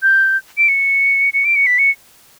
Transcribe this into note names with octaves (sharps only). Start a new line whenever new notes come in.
G6
D7
C#7
C#7
D7
C#7
B6
C#7